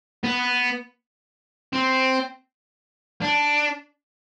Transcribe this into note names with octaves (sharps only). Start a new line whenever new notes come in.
B3
C4
D4